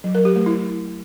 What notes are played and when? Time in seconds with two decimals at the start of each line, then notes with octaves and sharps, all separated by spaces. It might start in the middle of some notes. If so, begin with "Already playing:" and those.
0.04 F#3
0.15 A#4
0.25 G4
0.36 A3
0.46 E4